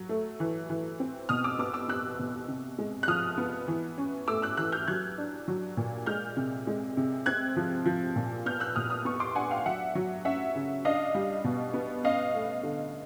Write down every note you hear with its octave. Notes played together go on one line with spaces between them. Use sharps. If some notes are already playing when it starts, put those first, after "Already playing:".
Already playing: F#3
A3
E3
E3
C4
B2 D#6 F6
D6 E6
B3 D6 E6
D6 E6
B3 E6 F#6
B2
C3
G#3
F#6
F3 D#6 F6
B3
E3
C#4
A3 D6 E6
E6 F#6
E3 E6 F#6
F6 G6
F#3 F#6 G#6
D4
F#3
A#2
G#3 F6 G6
C3
G#3
C3
C4 F#6 G#6
F3
F3
A#2
B3 F6 G6
E6 F#6
A#2 D#6 F6
D#6 F6
B3 C#6 D#6
C6 D6
D4 F#5 G#5
F5 G5
F#3 E5 F#5
F#3
C#4 E5 F#5
C#3
D4 D#5 F5
G3
B2
B3
C#4 D#5 F5
A3
D3